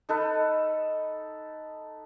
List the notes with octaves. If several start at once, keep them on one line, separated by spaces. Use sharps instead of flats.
D#4 A4 B4